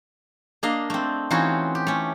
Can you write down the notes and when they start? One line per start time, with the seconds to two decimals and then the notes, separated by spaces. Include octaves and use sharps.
0.63 A#3 D4 D#5 F5
0.90 A3 C4
1.31 E3 C4 C#4 D#4 F4 F#4
1.75 G4
1.87 A3 C#4